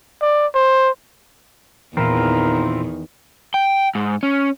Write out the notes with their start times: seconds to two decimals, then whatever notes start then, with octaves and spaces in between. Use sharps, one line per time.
0.22 D5
0.55 C5
1.97 E2 A#2 D#3 E3 C4 E4 F4 A#4
3.54 G5
3.95 G#2
4.23 C#4